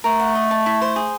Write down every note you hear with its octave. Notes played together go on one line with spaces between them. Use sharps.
A3 A#4
F#5
D#5
A5
E4
C5
G#4